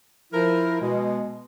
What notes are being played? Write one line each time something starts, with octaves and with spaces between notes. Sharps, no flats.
F3 E4 A#4
B2 G#3